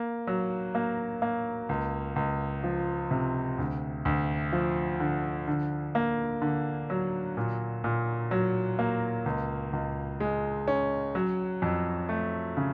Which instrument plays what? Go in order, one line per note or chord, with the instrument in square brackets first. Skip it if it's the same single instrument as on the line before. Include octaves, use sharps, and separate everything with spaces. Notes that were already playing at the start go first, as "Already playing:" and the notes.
Already playing: [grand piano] A#3
F#3
A#3
A#3
C#2
C#2
F3
C3
D2
D2
F3
D3
D3
A#3
D3
F#3
A#2
A#2
F#3
A#3
C#2
C#2
G#3
C#4
F#3
F2
A3
C#3